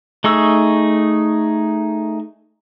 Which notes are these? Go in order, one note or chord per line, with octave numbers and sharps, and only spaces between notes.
A3 D#4 G#4 C#6 E6